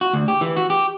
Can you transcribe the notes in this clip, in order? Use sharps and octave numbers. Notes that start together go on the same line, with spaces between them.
F#4
D2
G4
E3
F#4
G4